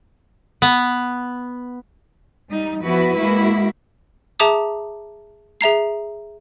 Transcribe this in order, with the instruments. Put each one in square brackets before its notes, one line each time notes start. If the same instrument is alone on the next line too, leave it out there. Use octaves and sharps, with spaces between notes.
[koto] B3
[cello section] G3 D#4
F3 B3 E4 F#4 B4
G#3 A#3 E4 F#4
[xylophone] G#4 E5 A5 A#5 D6 D#6
G#4 E5 A#5 C7